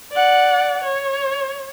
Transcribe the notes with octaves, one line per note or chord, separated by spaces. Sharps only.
D5 F#5
C#5